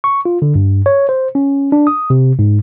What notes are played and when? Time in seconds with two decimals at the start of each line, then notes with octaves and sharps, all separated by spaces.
0.04 C#6
0.25 F4
0.42 D3
0.55 G2
0.86 C#5
1.09 C5
1.35 C#4
1.72 D4
1.87 D#6
2.10 C3
2.39 G#2